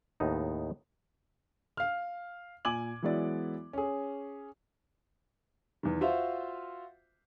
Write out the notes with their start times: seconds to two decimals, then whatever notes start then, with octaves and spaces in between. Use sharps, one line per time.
0.20 D#2 A2 B3 D#4
1.77 F5 F6
2.65 A#2 G#5 D6 G#6 F#7
3.02 E3 F#3 G#3 B3 E4 D5
3.73 C#4 G#4
5.83 E2 D#3
6.01 F4 F#4 C5 E5 F5